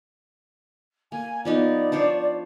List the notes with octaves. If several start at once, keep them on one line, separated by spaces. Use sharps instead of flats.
A#3 G#5
F3 B3 D#4 D5
D4 C5 C#5